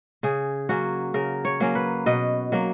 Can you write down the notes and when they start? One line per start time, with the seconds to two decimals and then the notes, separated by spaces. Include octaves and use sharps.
0.23 C#3 G#4
0.69 F#3 A#3 C#4 F#4
1.14 C#3 A#4
1.45 C#5
1.60 F#3 A#3 C#4
1.75 B4
2.06 B2 D#5
2.52 F#3 A#3